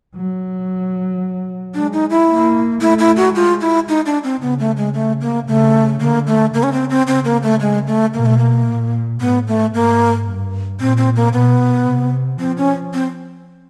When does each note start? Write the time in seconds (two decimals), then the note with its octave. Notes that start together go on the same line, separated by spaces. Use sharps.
0.15 F#3
1.74 G#3 D4
1.93 D#4
2.10 E4
2.29 A#3
2.81 A3 E4
2.99 E4
3.17 F#4
3.35 G#3 F4
3.61 E4
3.89 D#4
4.06 D4
4.24 C4
4.41 C#3 B3
4.59 A3
4.77 G#3
4.94 A3
5.21 A#3
5.48 C#3 A3
6.01 D3 A#3
6.27 A3
6.54 C#3 A#3
6.63 C#4
6.72 C4
6.90 C4
7.07 C#3 C4
7.25 A#3
7.43 A3
7.60 G#3
7.87 A3
8.14 B2 A#3
8.26 A3
8.38 A#3
8.67 A#2
9.20 A2 B3
9.48 A3
9.74 G#2 A#3
10.27 G2
10.80 A#2 C4
10.97 C4
11.16 A#3
11.33 B2 B3
11.87 C3
12.39 F3 C4
12.57 C#4
12.93 C4